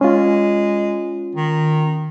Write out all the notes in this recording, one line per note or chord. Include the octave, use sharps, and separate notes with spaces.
G#3 C#4 F4
D#3